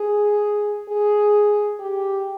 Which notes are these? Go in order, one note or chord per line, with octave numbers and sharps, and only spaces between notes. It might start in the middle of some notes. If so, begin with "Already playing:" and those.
Already playing: G#4
G#4
G4